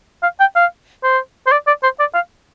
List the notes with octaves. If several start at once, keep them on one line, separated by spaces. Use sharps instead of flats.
F5
G5
F5
C5
C5
D5
D5
C5
D5
F5